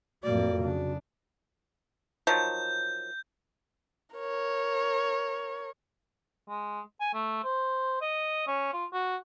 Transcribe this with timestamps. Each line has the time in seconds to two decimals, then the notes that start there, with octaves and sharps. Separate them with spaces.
0.24 F2 A2 F#3 A#3 F#4 D5
0.63 C#3 D4
2.27 D#3 F3 F#3 G6
4.16 A#4 C#5
6.49 G#3
7.00 G#5
7.14 A3
7.44 C5
8.02 D#5
8.47 C#4
8.73 F4
8.93 F#4